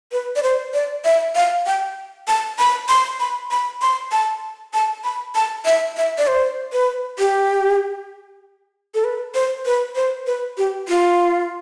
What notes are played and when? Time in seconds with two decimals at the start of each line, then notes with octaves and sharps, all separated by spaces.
0.12 B4
0.36 D5
0.43 C5
0.74 D5
1.05 E5
1.36 F5
1.66 G5
2.28 A5
2.59 B5
2.89 C6
3.20 B5
3.51 B5
3.82 C6
4.12 A5
4.74 A5
5.04 B5
5.35 A5
5.65 E5
5.97 E5
6.18 D5
6.27 C5
6.73 B4
7.19 G4
8.94 A4
9.04 B4
9.34 C5
9.66 B4
9.96 C5
10.27 B4
10.58 G4
10.88 F4